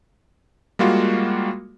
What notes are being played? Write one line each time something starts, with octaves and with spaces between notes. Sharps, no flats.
G3 G#3 A#3 F4 F#4